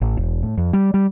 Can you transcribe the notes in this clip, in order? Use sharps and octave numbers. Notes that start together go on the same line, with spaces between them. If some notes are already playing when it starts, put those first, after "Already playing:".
A1
E1
A2
F2
G3
G3